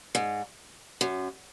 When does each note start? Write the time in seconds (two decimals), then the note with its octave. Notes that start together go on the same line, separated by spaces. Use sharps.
0.15 G#2
1.01 F#2